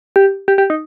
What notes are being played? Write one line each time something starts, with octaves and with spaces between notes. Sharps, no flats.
G4
G4
G4
D#4